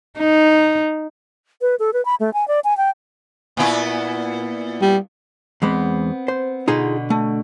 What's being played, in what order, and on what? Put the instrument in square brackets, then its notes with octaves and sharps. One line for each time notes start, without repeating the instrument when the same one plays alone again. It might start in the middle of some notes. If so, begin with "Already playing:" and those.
[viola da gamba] D#4
[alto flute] B4
A4
B4
B5
A3
G#5
D5
G#5
G5
[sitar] A#2 B3 E4
[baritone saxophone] G3
[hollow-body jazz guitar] E2 G#3 B5 [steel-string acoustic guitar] B3 C4
[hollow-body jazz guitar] C5
[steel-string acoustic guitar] B2 D3 [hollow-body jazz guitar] D#4 F4 G#4
[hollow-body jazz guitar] A3